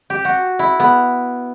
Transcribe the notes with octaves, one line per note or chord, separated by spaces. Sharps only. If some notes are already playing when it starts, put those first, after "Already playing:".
G4
F#4
E4
B3